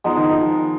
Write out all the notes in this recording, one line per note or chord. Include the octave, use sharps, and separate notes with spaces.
F3 G#3 B3 D#4
D#3
F3